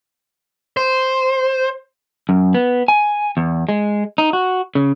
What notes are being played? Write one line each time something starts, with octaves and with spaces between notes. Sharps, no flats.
C5
F#2
B3
G#5
E2
G#3
D#4
F#4
C#3